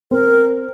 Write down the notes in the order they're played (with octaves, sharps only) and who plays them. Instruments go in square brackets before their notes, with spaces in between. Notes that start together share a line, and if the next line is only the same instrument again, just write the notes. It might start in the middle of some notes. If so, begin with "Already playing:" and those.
[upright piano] C4 [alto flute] A#4